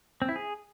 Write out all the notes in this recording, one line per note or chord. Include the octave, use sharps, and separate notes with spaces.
C4
E4
G#4